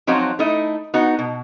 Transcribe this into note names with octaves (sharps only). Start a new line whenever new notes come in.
F3 F#3 C4 D#4 F#4 D#5
A3 D#4 E4 D#5
B3 D#4 F#4
B2